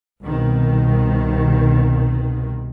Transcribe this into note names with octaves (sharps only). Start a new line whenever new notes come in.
C2 B2 D#3